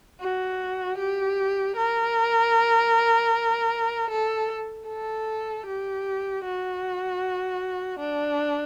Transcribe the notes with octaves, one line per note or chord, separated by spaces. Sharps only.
F#4
G4
A#4
A4
A4
G4
F#4
D4